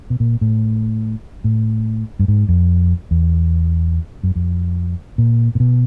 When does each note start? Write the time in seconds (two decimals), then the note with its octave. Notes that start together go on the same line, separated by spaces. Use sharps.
0.10 B2
0.20 A#2
0.41 A2
1.44 A2
2.19 G2
2.28 G#2
2.49 F2
3.11 E2
4.23 F#2
4.35 F2
5.18 A#2
5.55 A#2
5.60 B2